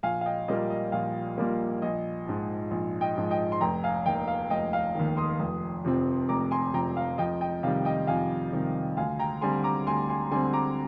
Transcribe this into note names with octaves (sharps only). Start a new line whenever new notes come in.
A#1 F5 G#5
F5
D#5 G5
A#2 G3 A#3 D#5
D#5
A#1 F5
A#2 G3 A#3
A#1 D#5
G#2 F3
A#1
D#5 G5
G#2 F3
D#5 G5
C6
F1 G5 A#5
F5 G#5
D#2 D#3 D#5 G5
F5
F1 D#5 G5
F5
D#2 D#3
C6 D#6
F1
F2 C3 F3 C4
F1 A#5 D6
G#5 C6
F2 C3 F3 C4 G5 A#5
F5
F2 D#5 G5
D#5 G5
C3 D#3 G3 F5
D#5 G5
F2 F5 G#5
C3 D#3 G3
D2 F5 G#5
G5 A#5
D3 G3 C4 G#5 C6
A#5 D6
D2 G#5 C6
G#5 C6
D3 G3 C4 G#5 C6
A#5 D6